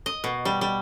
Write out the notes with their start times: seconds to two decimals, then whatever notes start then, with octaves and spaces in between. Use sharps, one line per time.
0.06 D#5
0.24 B2
0.45 G3
0.61 G3